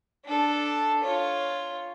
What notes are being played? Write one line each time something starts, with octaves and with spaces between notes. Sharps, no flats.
D4 A4
F4 C#5